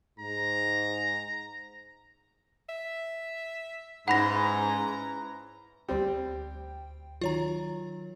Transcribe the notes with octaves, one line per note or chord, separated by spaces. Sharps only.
G#2 A#5
E5
G#2 C#4 E4 B4 F#5 A#5 B5 A#6
D2 G3 C4 G5
D#3 F#3 F4 C#5 A#5